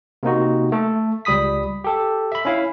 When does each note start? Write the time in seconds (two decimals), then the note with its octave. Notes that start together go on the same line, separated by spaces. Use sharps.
0.23 C3 A#3 D#4 F#4
0.72 A3 A4
1.25 C#2 G3 B5 D#6 B6
1.84 G4 A4
2.32 E5 B5
2.45 C#4 E4 F5